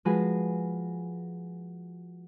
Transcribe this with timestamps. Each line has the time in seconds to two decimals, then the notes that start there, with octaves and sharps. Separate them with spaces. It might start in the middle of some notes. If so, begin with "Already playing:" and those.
0.05 F3 G#3 F#4 G#4 B4